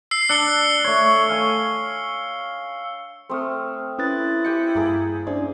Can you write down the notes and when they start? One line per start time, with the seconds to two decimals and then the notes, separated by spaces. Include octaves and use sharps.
0.11 E6 C7
0.29 D4 E6 C#7 G7
0.84 A3 C#5
1.29 F5 G#5 C#6
3.30 A3 C4 A4 D#6 F6
3.99 C#4 E4 B4 D#6 F#6 A6
4.45 G4 G5 G#5 C#7
4.75 G2 A#3 G#4
5.27 C#4 D4 E4 G#4 C5